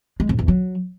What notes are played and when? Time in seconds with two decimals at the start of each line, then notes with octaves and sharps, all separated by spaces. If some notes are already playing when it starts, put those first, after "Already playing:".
0.20 G#3
0.29 F2
0.39 E2
0.48 F#3